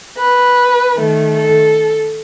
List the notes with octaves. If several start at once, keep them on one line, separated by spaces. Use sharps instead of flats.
B4
D#3 A3
A4